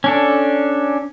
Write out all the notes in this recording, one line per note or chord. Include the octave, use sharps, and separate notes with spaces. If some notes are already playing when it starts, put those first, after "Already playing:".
C#4 D4 A4